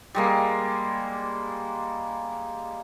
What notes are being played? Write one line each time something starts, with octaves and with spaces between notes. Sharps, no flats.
G3 G#3 A#3